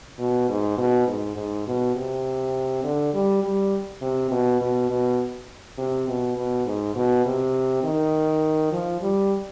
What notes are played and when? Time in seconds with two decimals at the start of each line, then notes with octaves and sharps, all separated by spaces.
0.18 B2
0.49 G#2
0.77 B2
1.07 G#2
1.36 G#2
1.67 B2
1.95 C3
2.84 D3
3.13 G3
3.43 G3
4.01 C3
4.31 B2
4.61 B2
4.89 B2
5.78 C3
6.08 B2
6.36 B2
6.66 G#2
6.95 B2
7.25 C3
7.83 D#3
8.71 F3
9.01 G3